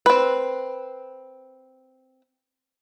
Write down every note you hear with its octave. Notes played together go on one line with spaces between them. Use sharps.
C4 B4